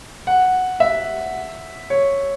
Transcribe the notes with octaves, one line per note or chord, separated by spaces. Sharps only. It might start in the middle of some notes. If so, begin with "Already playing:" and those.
F#5
E5
C#5